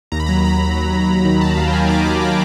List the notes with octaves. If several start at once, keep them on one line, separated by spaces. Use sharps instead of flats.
D#2 A#5
B5
F#3 A#5
D#2 B5
D#2
F#3
F#3
D#2
D#3
D#2 A5
D#2 F5
G5
F#3 G#5
D#3 D6
D#2 D6
D6